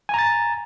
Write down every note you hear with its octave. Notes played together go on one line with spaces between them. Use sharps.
G#5 A#5 A6